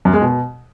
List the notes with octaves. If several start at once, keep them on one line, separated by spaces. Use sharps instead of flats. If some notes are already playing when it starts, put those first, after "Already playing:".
F#2
G#3
B2